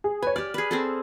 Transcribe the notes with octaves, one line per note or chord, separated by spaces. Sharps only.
G#4
B4 C#5 G#5
G4 D5 F6
G#4 B4
C4 G#4 A4